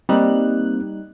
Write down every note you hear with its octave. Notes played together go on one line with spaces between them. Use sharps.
G3 A#3 C4 D#4 F#6